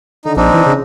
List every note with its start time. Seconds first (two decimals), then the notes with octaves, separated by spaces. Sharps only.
0.25 D3 D#4
0.37 A#1 C4 D4 D#4
0.54 E3
0.66 C#3